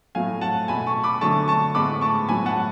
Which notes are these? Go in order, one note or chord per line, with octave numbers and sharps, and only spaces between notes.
A2 F#3 A3 F5 G#5
F#5 A5
B2 A3 G#5 B5
A5 C#6
B5 D6
D3 F#3 A3 A5 C#6
A5 C#6
A2 G#3 B3 B5 D6
A5 C#6
A2 F#3 B3 G#5 B5
F#5 A5